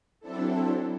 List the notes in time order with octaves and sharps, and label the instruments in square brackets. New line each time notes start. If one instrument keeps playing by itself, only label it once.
[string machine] F#3 C4 D4 E4 A4